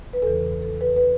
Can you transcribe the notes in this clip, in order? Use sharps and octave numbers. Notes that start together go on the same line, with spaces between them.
B4
E2 C#3 E3 A4
A4
B4
B4